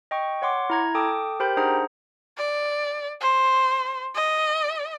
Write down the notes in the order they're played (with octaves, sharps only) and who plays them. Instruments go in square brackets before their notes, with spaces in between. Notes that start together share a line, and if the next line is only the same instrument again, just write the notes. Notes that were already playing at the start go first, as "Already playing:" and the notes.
[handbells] D#5 G5 C#6
C#5 F#5 C6 D6
E4 A#5 G#6
A4 G5 A5 D6 D#6
G4 A#4 C5 G5 B5 G6
D4 D#4 G#4 C5 F#5 A#5
[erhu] D5
C5
D#5